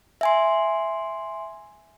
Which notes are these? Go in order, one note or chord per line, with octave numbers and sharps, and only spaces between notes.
E5 G#5 C6